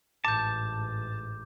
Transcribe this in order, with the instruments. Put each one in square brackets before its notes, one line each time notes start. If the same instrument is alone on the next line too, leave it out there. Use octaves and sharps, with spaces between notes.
[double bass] A1 G#2 [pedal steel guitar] A5 [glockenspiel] D6 G6